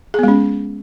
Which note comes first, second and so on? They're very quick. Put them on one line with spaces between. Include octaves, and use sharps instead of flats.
G#4 B3 G#3 C#4